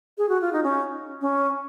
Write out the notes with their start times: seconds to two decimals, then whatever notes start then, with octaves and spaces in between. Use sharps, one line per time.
0.18 G#4
0.29 F#4
0.41 F4
0.53 D#4
0.63 C#4
1.21 C#4